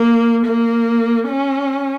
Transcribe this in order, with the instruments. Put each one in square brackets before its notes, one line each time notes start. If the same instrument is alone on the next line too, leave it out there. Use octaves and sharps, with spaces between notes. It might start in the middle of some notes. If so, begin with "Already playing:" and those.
Already playing: [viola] A#3
A#3
C#4